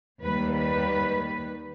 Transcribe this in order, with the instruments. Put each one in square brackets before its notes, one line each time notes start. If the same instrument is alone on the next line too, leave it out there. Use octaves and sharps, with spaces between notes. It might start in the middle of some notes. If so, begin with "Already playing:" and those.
[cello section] D#2 D#3 G3 B4
B4